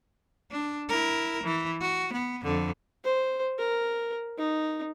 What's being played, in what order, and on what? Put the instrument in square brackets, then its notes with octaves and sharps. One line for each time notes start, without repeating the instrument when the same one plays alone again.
[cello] D4
E4 A#4
E3
F#4
B3
F2 D3
[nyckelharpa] C5
A#4
D#4